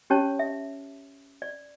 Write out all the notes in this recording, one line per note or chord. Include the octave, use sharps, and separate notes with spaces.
C#4 G4 C#5 A5
E5
D5